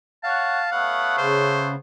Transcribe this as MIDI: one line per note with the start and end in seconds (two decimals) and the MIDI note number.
0.23 0.60 73
0.23 1.26 77
0.23 0.60 78
0.23 0.67 81
0.72 1.74 57
0.72 1.74 59
0.72 1.74 73
0.72 1.16 78
1.18 1.75 49
1.18 1.77 72